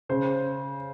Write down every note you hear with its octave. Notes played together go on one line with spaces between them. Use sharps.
C#3 C5